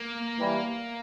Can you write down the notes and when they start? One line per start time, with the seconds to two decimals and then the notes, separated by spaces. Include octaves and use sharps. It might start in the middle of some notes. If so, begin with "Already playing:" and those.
Already playing: A#3
0.39 E3 G3